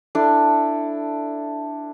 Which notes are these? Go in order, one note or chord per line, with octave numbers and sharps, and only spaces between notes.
D4 E4 A4